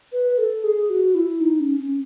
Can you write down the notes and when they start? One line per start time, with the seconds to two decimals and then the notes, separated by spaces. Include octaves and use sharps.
0.12 B4
0.38 A4
0.64 G#4
0.90 F#4
1.15 E4
1.41 D#4
1.60 C#4
1.80 C#4